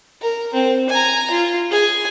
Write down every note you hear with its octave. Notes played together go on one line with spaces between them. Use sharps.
A#4
C4
G#5 A#5
F4
G#4 G#5